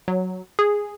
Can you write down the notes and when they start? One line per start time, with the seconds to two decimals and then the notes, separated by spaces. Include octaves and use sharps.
0.08 F#3
0.59 G#4